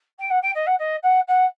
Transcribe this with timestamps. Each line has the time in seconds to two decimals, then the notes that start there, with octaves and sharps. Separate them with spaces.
0.19 G5
0.30 F#5
0.42 G5
0.54 D#5
0.66 F#5
0.78 D#5
1.03 F#5
1.28 F#5